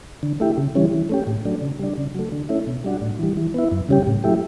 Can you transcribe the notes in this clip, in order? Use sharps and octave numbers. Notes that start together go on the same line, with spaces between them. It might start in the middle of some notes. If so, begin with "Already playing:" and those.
D3
A3 E4 G4
C#3
E3 G3 C#4
E3
A3 C#4 G4
A2
F#3 A3 D4
C#3
G3 D4
C#3
F#3 A3
D3
A3 C#4 E4
B2
G3 D4 F#4
A2
E3 G3
E3
B3 E4
F#2
C#3 G3 C#4 G4
A2
F#3 A3 E4 G4